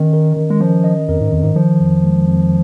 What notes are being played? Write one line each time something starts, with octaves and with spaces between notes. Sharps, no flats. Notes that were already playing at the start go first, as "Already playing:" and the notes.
Already playing: D#3 C#4 D#5
A#4
D#3
G#3
F3 C#4
D#5
F2 A#4
G#2
F2 D#3
G#2
D#3 F3
F2
G#3
F2